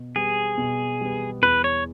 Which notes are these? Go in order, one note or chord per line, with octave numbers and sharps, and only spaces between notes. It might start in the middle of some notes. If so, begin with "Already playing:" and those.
Already playing: B2
G3 B3 G#4
B2
G3 B3
E2 B4
C#5